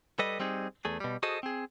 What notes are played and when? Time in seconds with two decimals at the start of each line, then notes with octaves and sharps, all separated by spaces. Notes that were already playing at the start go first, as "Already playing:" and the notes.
0.19 G3 A4 B4 D#5
0.40 G3 C4 D#4 G#4
0.85 E2 A3 G#4
1.00 B2 G3
1.23 F#4 G#4 A4 C5 D#5
1.43 C4 G#4